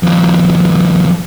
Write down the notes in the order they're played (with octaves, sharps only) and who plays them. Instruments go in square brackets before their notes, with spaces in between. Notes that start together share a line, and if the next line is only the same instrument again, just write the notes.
[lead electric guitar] D#2 F3